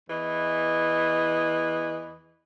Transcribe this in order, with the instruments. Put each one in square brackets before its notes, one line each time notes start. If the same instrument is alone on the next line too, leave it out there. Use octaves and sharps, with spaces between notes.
[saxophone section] E2 E3 D#5